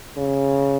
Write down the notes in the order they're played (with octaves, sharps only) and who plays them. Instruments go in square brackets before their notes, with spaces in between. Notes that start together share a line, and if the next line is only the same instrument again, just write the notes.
[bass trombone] C#3